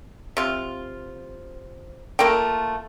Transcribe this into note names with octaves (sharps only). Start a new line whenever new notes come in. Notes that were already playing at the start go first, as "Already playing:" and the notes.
C3 F4
A3 A#3 F4 G5